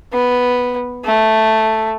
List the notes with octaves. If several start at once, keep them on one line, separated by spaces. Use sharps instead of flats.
B3
A3